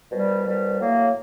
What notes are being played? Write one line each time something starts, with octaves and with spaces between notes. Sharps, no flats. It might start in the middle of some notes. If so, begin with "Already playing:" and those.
C2 B2 G3
C2 B2 G3
A2 F#3 A#3